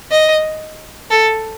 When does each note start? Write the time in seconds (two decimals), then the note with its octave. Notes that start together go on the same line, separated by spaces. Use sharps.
0.12 D#5
1.11 A4